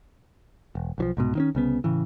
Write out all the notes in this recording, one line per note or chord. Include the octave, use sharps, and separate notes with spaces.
E1
B1 E3 F3
C2 G#2 B2
D#3 C4 C#4
C2 C#3 B3
A2 C#3 E3